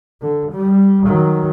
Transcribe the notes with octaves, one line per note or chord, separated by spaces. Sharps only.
D3
G3
D#3 F#3